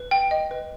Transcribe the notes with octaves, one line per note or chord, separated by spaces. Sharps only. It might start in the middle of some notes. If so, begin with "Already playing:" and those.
Already playing: B4
G5
D#5
B4